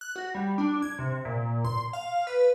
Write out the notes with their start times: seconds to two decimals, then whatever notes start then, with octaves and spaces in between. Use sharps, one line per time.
0.01 F#6
0.16 F#4
0.35 G3
0.58 D4
0.82 G#6
0.98 C3
1.25 A#2
1.65 C6
1.93 F5
2.27 B4